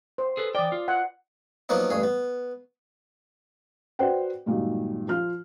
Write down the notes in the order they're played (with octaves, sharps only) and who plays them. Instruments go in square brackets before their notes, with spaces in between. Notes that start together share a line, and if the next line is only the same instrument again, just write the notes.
[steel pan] C5
[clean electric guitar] G#4 A4 B4
[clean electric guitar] E3 G5 [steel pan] D5 D#6
[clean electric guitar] F4
[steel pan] F#5
[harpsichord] F3 F#3 A#3 B3 D#4
A1 G2 G#4
B3
[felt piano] F#4 B4 C5 D5 F#5 G5
G2 A#2 D#3 F#3 G#3
F3 F4 F6